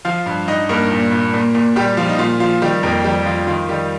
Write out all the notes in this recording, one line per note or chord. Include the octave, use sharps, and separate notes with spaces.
F3 F4 F5
G2
G2 D#4 D#5
G2 A#3 A#4
A#2
A#2
A#2
A#2
A#2 G3 G4
F3 F4
D#4
A#2 F4
F3 F4
D#3 G3 G4
F2 A#3 A#4
F3 G3 G4
F3 F4
D#3 F4
D#3 G3 G4